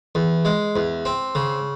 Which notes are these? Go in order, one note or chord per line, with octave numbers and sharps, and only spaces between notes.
E2
G#3
E2
C4
C#3